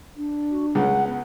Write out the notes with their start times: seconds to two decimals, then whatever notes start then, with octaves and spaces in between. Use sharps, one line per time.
0.17 D4
0.51 F#4
0.75 C#2 C#3 F#5
1.07 B3